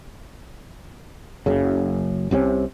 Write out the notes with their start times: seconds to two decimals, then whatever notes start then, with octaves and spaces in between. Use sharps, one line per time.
1.46 F#1 F#2 C#3
2.31 C2 C3 F#3 C#4